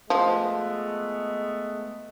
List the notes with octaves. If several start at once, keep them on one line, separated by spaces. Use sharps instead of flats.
F3 G#3 A3 B3